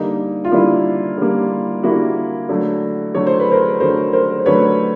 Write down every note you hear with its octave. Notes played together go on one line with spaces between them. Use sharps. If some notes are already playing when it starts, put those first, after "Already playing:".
Already playing: D3 G3 A#3 D#4
F4
D3 G3 A#3 E4
D3 G3 A#3
D3 G3 A#3 E4 F#4
D3 F#3 A3
D3 F#3 A3 C#5
C5
B4
A#4 C5
D3 F#3 A3 A#4 C5
A#4 C5
C5
D3 F#3 A3 B4 C#5